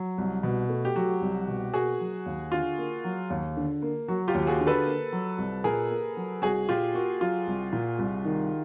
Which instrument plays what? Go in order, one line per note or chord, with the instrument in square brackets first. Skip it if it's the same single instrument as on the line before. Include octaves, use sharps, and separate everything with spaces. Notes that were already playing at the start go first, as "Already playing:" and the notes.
Already playing: [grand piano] F#3
C2
B2
A3
[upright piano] G4
[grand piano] F#3 [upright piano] F#4
[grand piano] C2
B2
[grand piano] A#3 [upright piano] F#4 G#4
[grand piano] F#3
D#2
[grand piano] D3 [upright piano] F4
[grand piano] A#3
F#3
D#2
D3
A#3
[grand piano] F#3 [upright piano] F#4
[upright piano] F4 G4
[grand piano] D#2
[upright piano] F#4 G#4
[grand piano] D3
[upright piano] A4 B4
[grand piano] A#3
F#3
C2
[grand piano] A#2 [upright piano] G#4 A#4
[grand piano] A#3
F#3
[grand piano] C2 [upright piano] F#4 G#4
[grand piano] A#2 [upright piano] F4 G4
[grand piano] A#3 [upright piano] F#4
[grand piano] F#3 [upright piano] F4
[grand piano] C2
A#2
C2
D#3